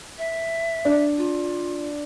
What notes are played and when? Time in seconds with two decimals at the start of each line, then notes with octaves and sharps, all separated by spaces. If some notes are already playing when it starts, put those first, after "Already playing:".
0.18 E5
0.85 D4
1.18 F4